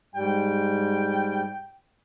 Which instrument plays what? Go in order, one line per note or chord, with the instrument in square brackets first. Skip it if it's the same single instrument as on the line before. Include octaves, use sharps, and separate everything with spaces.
[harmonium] G#2 G3 [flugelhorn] G5